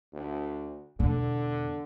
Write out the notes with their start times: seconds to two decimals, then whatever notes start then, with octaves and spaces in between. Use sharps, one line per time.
0.13 D2
1.00 E2 B2 D3